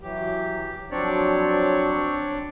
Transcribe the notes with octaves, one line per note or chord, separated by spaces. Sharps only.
E3 F#3 G4
F3 F#3 C4 D4 C#5 D5